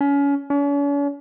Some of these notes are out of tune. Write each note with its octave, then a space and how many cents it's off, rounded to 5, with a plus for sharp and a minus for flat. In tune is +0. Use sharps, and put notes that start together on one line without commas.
C#4 +30
C#4 +45